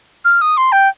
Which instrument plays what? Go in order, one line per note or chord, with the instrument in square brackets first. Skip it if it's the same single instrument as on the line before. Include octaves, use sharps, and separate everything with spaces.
[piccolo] F6
D#6
C6
G5